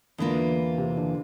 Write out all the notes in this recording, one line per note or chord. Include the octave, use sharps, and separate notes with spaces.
E2 D3 E3 A#3 F4
C3
D3